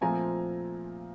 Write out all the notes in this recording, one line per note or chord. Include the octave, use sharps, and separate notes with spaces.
A#2 F3 A3 C4 G#5 A#5